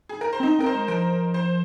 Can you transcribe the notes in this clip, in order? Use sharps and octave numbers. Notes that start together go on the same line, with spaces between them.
G#4
A#4
C5
C4
D#4 D#5
C4 A#4
C5
G#3
F3 A#4
C5